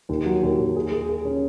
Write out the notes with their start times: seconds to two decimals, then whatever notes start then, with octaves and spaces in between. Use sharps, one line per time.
0.09 D#2
0.26 F#3
0.43 D#2
0.58 D#2
0.76 G#4
0.92 G#4
1.09 G#4
1.25 C#4